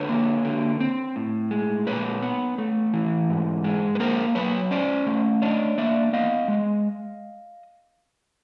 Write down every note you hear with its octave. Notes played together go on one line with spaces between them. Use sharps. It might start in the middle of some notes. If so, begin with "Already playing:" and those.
Already playing: D3 B4 C#5
A#3
D3
C4
A2
G#3
A#2 B4 C#5
B3
A3
E3
G#2
G#3
B4
A#3 A#4 C5
F#3 B4 C#5
C#4 C5 D5
A3
D4 C#5 D#5
A#3 D5 E5
B3 D#5 F5
G#3